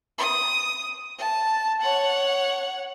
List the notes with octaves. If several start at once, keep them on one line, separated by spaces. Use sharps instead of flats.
D#6
A5
C#5 F#5